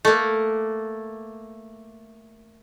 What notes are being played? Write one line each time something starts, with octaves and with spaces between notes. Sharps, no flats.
A3 A#3